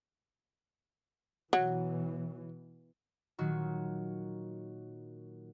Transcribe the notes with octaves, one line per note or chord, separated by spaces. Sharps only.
B2 E3 F#3
A#2 D#3 F#3 F#4